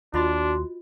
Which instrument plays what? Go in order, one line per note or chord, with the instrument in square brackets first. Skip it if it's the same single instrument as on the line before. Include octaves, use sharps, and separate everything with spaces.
[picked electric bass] D#2 [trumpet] D4 [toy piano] F4 D#5 B5 [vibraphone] F#4 C6